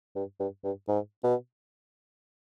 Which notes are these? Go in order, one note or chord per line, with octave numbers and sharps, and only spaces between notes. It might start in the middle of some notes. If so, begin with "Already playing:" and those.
G2
G2
G2
G#2
B2